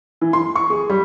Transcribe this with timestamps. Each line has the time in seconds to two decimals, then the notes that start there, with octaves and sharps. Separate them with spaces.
0.21 E3
0.33 C6
0.56 C#6
0.70 G#4
0.90 G3